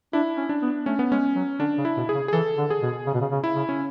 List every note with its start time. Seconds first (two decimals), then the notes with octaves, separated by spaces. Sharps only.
0.13 D4 E4
0.37 C#4
0.49 D4
0.62 B3
0.86 A3 C#4
0.99 B3
1.11 G#3 C#4
1.35 F#3
1.59 D3 D4
1.78 C#3
1.85 E4
1.97 B2
2.09 G#4
2.15 C#3
2.28 G#4
2.33 E3 A4
2.58 D3
2.70 G#4
2.82 B2
3.07 C#3
3.14 B2
3.21 C#3
3.31 C#3
3.44 E4
3.56 C#3
3.69 C#4